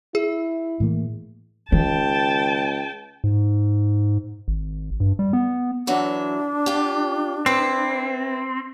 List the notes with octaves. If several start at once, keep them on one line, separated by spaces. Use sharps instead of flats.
E4 G#4
A2 E3 A#3
C#2 D#3 G5 A5
G#2
G#1
G2
G3
B3
E3 F#3 D4 E5
F4 G4
C4 E4 B4